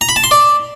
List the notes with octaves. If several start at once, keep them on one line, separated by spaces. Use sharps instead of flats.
A#5
B5
A5
C6
D5